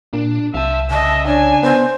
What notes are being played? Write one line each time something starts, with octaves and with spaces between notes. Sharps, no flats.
A#2 D4
C2 E5 F5 A5
C#3 D#5 E5 A5
D4 C#5 G#5
B3 C5